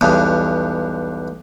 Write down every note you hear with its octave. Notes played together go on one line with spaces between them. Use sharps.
B1 E2 G2